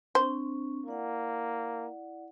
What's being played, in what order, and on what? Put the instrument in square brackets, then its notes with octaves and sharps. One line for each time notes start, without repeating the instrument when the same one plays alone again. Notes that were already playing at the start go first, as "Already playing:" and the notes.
[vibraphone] C4 D4 C#6 [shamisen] C5
[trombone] A#3 [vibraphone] E4 D5 F#5